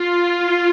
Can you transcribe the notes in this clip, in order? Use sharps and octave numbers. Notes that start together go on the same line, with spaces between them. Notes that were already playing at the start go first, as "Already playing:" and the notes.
Already playing: F4